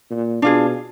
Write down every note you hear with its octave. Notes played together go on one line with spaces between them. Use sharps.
A#2
B2 D4 F4 G#4